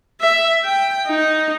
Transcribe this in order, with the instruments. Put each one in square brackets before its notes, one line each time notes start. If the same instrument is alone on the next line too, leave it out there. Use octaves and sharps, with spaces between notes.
[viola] E5
G5
D#4